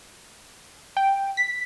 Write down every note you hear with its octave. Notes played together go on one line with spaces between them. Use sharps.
G5
B6